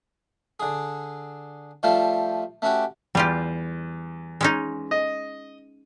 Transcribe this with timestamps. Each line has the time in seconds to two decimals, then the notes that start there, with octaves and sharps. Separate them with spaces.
0.60 D3 G#4
1.83 F3 G3 A3 F4
2.62 A3 C#4 F#4 G4
3.15 E2 G3 F4 G4
4.41 G#3 C#4 D#4
4.91 D#5